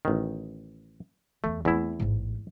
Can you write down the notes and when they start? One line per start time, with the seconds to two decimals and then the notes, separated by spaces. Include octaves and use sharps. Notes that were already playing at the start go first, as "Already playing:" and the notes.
0.05 A1 D#3
1.44 E2 A3
1.65 E2 A3 C4 E4
2.00 A1 G#2